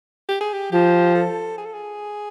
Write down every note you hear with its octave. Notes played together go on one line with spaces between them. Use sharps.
G4
G#4
G4
F3 G4
A4
G#4
A4
G#4